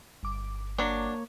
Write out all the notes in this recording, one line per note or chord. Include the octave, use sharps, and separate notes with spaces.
G1 D6
F#3 A#3 D4 C#5